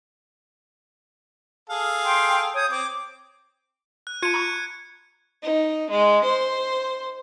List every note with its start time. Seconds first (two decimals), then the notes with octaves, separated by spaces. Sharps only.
1.70 G#4 A4 F5
2.05 G5 C6
2.55 C#5 D#6 G6
2.71 C4 D6
4.07 F#6
4.22 F4 A5 G#6 C#7 D#7
4.34 A#5 B5 C#6
5.43 D#4
5.90 G#3
6.24 C5